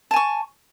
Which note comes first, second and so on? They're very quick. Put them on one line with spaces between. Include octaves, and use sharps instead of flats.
A5 G#5 C#6